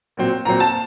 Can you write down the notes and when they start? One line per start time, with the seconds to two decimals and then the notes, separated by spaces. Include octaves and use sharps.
0.17 A#2 F#3 C4
0.45 A#2 F#3 C4 A#5
0.60 A5